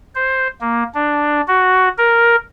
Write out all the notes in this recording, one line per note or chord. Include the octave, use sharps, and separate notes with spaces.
C5
A#3
D4
F#4
A#4